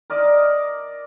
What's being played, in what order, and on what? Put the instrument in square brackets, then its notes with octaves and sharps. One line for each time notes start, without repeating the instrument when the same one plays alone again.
[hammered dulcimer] A#4 D5 D#5